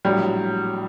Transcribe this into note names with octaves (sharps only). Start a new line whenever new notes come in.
A#1 A2 F#3 G3